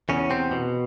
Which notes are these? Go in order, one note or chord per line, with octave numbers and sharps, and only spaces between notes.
E2 C#3 C#4
C3 C4
B2